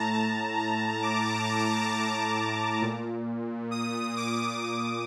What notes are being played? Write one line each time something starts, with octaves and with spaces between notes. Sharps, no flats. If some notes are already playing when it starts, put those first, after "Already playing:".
Already playing: A2 A5 A#5
A5
A#5
D6
A#2
D#6
D6